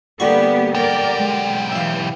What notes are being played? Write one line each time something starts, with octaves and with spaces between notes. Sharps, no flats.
D3 G3 A#3 B3 G4 F#5 C#6
B1 G4 A#4 D5
G#3
E3 E5 F5